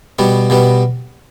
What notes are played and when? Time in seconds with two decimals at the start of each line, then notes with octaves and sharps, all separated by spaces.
0.19 B2 G3 B3
0.50 B2 G3 B3